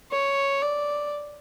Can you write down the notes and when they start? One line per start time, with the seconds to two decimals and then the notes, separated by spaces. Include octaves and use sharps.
0.12 C#5
0.63 D5